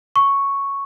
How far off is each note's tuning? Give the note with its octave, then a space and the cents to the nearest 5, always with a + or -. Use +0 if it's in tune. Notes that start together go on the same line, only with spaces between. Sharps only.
C#6 +0